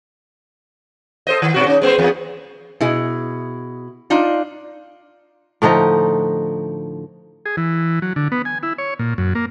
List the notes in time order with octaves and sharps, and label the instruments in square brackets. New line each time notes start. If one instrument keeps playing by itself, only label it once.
[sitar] A4 C5 D#5
D#3
G#2 B2 F#4
C#4 D#4
G#3 B3 C5
E2 B3
[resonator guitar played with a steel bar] B2 E4 G#4
D4 D#4 F4
[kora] A2 D3 F3 D#4
[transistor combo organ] G#4
E3
F#3
D3
B3
G#5
E4
C#5
A#2
F#2
A#3